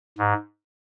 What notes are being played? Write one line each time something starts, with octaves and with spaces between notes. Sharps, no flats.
G#2